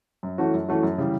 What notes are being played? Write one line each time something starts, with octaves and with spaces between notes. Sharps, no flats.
F#2
E3 A3 C#4 F#4
F#2
E3 A3 C#4 F#4
F#2
C#3 E3 G3